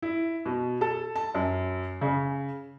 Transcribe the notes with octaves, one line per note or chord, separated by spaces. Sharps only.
E4
B2
A4
A5
F#2
C#3